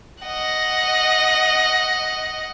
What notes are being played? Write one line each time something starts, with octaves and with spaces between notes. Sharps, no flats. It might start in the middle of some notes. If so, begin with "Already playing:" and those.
D#5 F#5